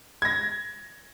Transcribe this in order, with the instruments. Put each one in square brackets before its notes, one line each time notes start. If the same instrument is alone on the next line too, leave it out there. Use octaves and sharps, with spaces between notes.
[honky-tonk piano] G#6 A#6